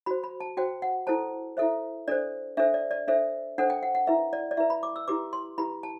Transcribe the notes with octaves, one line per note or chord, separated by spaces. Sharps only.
F#4 C5 B5
B5
A5
F#4 C5 G5
F#5
E4 A4 C5 A5
E4 A4 C5 E5
D4 A4 C5 D5
D4 A4 C5 E5
D5
D5
D4 A4 C5 E5
D4 A4 C5 F#5
G5
F#5
F#5
E4 B4 E5
D5
D5
E4 B4 E5
B5
D6
E6
E4 G4 B4 D6
C6
E4 G4 B4 B5
A5